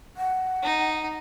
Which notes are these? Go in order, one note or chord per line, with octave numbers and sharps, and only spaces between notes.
F#5
D#4